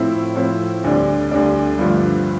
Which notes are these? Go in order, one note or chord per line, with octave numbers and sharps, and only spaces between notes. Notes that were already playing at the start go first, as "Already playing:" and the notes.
Already playing: A2 F3 C4 E4
A2 F3 C4 E4
D2 D3 G3 D4
D2 D3 G3 D4
G2 D3 F3 A3